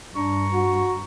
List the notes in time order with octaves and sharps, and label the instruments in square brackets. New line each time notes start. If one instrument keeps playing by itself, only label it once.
[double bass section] G2 [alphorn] D4 [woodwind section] A#5 C#6
[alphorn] F#4